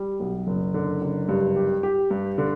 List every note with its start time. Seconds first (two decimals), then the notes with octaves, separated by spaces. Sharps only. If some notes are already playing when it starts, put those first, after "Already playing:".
Already playing: G3
0.20 B1
0.47 F#1
0.74 D3
1.02 F#1
1.29 G2
1.56 G4
1.83 G4
2.11 G2
2.38 D3